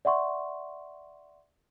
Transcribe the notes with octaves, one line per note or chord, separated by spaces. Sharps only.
D5 E5 F#5 C6 C#6